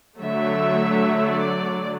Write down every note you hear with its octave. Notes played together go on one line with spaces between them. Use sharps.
D3 F#3 A3 E5
D5